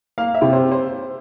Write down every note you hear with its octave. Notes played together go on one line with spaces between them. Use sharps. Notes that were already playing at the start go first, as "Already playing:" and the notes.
A#3 F5
E5
C3
C5
C5